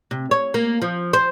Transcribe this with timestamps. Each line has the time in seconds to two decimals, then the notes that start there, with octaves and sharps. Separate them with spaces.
0.11 C3
0.31 C#5
0.54 A#3
0.82 F3
1.13 C5